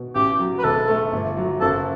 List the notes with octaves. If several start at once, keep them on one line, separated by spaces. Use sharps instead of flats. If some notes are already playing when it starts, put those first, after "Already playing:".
Already playing: B2
A1 G4
F#3
B4
E1 A4
A3
G1
F#3
F#1 A4